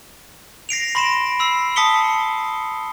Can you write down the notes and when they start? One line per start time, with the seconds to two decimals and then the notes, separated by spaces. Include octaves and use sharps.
0.69 A#6 C7 D7 F7
0.95 B5 C6 A#6 D7 E7
1.39 B5 E6 C7
1.76 A5 D#6 B6 C#7 G7